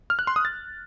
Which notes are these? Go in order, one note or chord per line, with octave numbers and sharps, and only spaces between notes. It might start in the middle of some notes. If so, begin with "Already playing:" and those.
F6
F#6
C6
D#6
A6